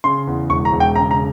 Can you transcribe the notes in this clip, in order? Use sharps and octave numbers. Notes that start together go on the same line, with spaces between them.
C#3 C6
E2
E1 C#6
A#5
E1
G5
C#3 A#5
A#5